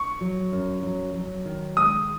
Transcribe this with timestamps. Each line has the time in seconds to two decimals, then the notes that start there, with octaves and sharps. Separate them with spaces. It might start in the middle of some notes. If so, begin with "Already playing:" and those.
Already playing: C#6
0.21 F#3
0.52 F#2
0.83 F#3
1.14 F#3
1.45 D#3
1.77 G#3 D#6